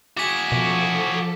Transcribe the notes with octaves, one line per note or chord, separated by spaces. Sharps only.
F#4 G#4 D6 B6
B2 F3 A4